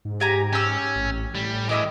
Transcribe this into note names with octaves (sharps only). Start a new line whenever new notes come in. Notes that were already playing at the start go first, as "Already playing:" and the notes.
G#2
G4 G#5 A#5
C#4 G4 E6
A1
A2 G3
E3 G#3 E4 D#5 D6